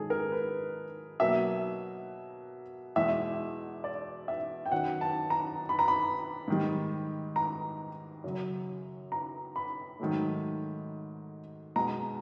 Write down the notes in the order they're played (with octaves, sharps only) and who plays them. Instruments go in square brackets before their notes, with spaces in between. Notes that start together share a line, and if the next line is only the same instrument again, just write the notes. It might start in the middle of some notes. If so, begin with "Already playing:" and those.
Already playing: [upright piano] G#2 D#3 F#3 G#4 A4
A#4
B4
B2 F#3 A#3 E5
E2 B2 G#3 E5
D5
E5
G5
F#2 D#3 F#3 F#5
A5
A#5
B5
A#5
B5
G#2 D#3 G3
A#5
F#2 C#3 F#3
A#5
B5
G#2 D#3 F#3 A3
B2 G#3 A#5